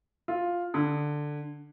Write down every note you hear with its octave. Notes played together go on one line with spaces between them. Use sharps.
F4
D3